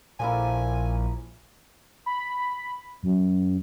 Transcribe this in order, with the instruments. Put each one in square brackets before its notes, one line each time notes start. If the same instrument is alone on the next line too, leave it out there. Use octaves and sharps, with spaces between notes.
[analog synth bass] A#1 [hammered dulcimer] F3 A#3 E4 [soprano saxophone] G#5
[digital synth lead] B5
F#2